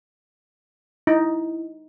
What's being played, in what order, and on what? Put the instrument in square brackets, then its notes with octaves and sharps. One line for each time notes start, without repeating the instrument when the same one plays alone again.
[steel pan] D#4 [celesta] E4